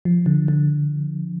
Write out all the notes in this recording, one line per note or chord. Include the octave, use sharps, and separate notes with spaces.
F3
D3
D3